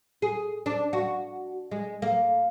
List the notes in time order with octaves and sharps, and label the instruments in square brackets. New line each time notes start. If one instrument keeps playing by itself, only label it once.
[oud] G#4
D4
F#4
G#3
A#3